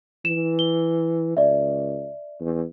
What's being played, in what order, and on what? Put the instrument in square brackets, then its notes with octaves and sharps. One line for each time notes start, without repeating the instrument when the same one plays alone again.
[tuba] E3 [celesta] E7
[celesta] G7
[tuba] C#2 [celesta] D5 E5
[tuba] E2